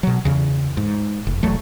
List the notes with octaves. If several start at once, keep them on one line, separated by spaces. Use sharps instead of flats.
B2 F#3
E2 C#3
G#2
F1
E1 E2 F#3 A3